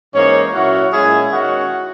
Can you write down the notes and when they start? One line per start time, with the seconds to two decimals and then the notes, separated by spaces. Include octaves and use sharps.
0.14 G#2 E3 A#3 C#4 D#4 C#5
0.53 A#2 F#3 C#4 E4 F#4 F#5
0.92 A#2 G#3 C#4 E4 G#4 G#5
1.31 D#3 G#3 C#4 E4 F#4 F#5